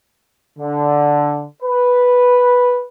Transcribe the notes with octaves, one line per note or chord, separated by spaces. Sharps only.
D3
B4